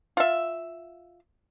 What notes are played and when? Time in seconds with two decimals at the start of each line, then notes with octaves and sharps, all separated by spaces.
0.17 F4 E5